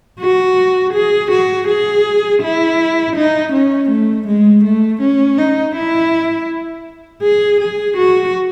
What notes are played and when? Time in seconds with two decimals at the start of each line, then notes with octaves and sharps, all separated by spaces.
0.20 F#4
0.93 G#4
1.31 F#4
1.68 G#4
2.42 E4
3.16 D#4
3.53 C#4
3.89 A3
4.27 G#3
4.64 A3
5.01 C#4
5.38 D#4
5.75 E4
7.22 G#4
7.60 G#4
7.96 F#4